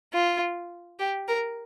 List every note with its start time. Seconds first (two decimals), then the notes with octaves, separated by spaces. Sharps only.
0.14 F4
0.99 G4
1.28 A#4